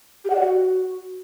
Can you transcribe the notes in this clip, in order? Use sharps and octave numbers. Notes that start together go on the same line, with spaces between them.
G4
F#5
D5
F#4